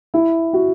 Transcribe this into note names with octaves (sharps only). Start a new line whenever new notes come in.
E4
F#4